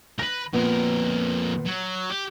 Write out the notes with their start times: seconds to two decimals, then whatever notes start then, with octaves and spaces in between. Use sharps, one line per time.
0.19 A#4 B4 A#6
0.53 F2 A#2 B3 A#4
1.65 F#3
2.10 G4